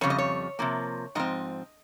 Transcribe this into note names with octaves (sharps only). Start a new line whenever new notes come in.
F2 C#3 G3 C#5
D#5
C#5
C3 F3 A#3
G#2 F3 C4 D#5